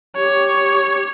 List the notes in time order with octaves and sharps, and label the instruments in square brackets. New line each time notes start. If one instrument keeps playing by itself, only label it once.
[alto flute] G4 [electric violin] C#5